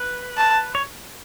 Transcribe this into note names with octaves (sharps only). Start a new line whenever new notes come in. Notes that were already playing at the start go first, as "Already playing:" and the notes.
Already playing: B4
A5
C#5